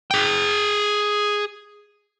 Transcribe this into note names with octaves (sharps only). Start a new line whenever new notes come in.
G#4 G5